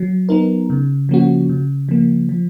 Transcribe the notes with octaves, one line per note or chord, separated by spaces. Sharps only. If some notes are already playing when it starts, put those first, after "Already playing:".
Already playing: F#3
B3 D#4 A#4
C#3
F3 A#3 C#4 F#4
C#3
F3 A#3
F3